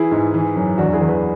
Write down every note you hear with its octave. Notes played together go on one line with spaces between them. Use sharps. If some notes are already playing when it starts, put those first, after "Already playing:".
Already playing: E3 E4 G#4
G#2
E3
F#2
E2 D4 F#4
E4 G#4
E2
G#4 B4